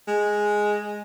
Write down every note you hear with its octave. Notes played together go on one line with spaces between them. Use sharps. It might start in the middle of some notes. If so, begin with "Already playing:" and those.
G#3